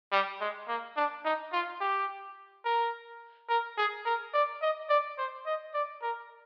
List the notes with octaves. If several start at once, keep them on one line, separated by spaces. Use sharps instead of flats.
G3
G#3
A#3
D4
D#4
F4
G4
A#4
A#4
G#4
A#4
D5
D#5
D5
C5
D#5
D5
A#4